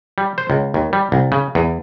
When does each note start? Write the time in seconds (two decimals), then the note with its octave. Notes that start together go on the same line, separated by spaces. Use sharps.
0.18 G3
0.38 C5
0.50 C#2
0.74 D#2
0.93 G3
1.12 C2
1.32 C#3
1.55 E2